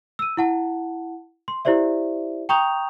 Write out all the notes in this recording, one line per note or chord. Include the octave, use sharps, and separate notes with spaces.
E6 D#7
E4 F#5 A5
C6
E4 G4 C5 D5 E5
G5 A#5 C#6 D#6 G6 F7